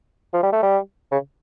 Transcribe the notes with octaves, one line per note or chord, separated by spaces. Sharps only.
F3
G3
A3
G3
C#3